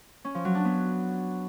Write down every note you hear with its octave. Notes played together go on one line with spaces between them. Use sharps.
C#4
F3
F#3
D4
B3